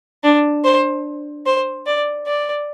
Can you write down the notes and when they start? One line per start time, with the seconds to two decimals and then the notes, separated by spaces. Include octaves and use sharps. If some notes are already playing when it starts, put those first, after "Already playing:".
0.24 D4
0.64 C5
1.46 C5
1.86 D5
2.27 D5